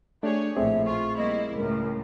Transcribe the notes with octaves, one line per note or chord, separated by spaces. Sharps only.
A3 D4 G4 G#4 C#5 D5
A#1 A2 A3 C4 G#4 E5
F4 C#6
G3 A#3 E4 D#5
C#2 A2 A#4